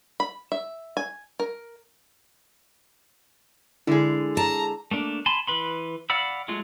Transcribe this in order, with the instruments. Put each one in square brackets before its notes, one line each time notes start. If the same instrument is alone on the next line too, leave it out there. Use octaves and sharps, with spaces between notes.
[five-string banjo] B5
E5
G#5
A#4
[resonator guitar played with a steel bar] D3 G#3 G#4 [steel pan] E4
[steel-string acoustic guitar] A5 [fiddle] A#5
[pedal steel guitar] A3 A#3 D4
G#5 A5 B5 C6
E3 B4 B5 C6
D5 F5 F#5 B5 E6
F#3 G#3 A3 F4